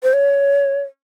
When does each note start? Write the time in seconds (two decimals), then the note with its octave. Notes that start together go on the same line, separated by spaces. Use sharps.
0.03 C5
0.13 C#5